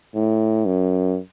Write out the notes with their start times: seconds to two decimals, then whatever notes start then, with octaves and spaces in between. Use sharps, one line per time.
0.15 A2
0.65 F#2